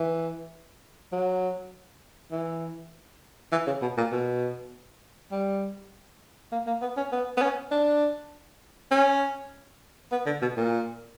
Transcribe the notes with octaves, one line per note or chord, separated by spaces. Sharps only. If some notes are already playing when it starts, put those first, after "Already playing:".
Already playing: E3
F#3
E3
E3
C#3
B2
A#2
B2
G3
A#3
A#3
B3
C#4
B3
B3
C#4
D4
C#4
B3
D3
B2
A#2